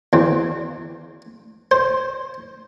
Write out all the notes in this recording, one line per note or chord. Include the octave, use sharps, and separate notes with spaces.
E2 C4
C5